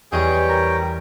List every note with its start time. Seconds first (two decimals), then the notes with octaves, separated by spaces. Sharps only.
0.12 E2 G3 G#4 C#5 D#5 G5
0.49 A#4